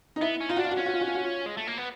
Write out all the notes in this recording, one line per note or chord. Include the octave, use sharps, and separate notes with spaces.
D#4
B3 E4
C#4
D#4 F4
D4 F#4
F4
F#4
C#4 F4
F#4
F4
F#4
F4
F#4
F4
G#3
A3
A#3
B3